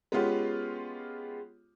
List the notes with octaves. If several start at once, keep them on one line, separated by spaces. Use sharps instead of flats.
G#3 B3 C#4 F4 G4